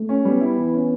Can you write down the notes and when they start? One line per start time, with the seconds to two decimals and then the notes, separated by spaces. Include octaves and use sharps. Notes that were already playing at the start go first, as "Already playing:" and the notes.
Already playing: A3
0.09 C#4
0.25 G3 B3
0.41 E4
0.57 E3
0.73 C#4